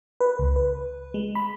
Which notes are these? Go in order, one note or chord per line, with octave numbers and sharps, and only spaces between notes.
B4
C#2
B4
G#3
B5